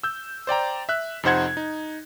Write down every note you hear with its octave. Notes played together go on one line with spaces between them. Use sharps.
E6 G6
C5 D5 G5 A#5
E5 F#6
F2 C3 D#4 C5 F#5 G#6
D#4